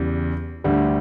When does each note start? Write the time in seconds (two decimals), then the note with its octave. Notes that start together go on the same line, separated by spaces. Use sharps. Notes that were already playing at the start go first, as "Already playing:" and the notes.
Already playing: E2 C#3 G3
0.64 D2 D3 G3